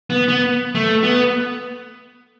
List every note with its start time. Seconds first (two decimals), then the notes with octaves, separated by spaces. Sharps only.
0.10 B3
0.28 B3
0.75 A3
1.03 B3